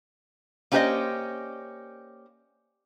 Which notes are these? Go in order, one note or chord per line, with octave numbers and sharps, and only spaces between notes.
A#3 C#4 G4 C5 D5 D#5